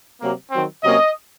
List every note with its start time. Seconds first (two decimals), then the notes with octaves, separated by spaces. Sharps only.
0.20 C3 F#3 A#3
0.51 D#3 F#3 C4
0.83 C3 F#3 A#3 C#4 D#5